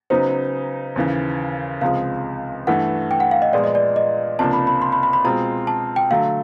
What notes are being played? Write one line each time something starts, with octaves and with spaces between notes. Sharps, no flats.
C#3 F#3 B3 D#4 C5
D#2 C#3 E3
C#2 C3 F3 G#3 F5
G2 E3 A3 F#5
G5
F#5
F5
D#5
A#2 F3 G#3 B3 D5
D#5
D5
D#5
C#2 C3 F3 A#3 D4 A5
B5
B5
C6
B5
B5
B5
B2 G#3 C4 F4 A#5
A5
G5
D3 F#3 A3 F5